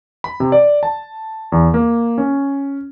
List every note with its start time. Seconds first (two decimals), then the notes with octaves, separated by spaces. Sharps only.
0.24 B5
0.40 C3
0.52 D5
0.83 A5
1.52 E2
1.74 A#3
2.18 C#4